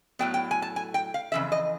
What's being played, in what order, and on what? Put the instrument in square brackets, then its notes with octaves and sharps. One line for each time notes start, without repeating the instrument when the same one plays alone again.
[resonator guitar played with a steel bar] A2 F#3 B3 G5
G5
G#5
A5
G#5
G5
F5
F2 C#3 E3 E5
D#5